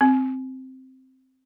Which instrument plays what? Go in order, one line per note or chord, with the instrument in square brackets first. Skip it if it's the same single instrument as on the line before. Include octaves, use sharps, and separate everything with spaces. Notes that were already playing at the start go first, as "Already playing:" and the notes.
[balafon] C4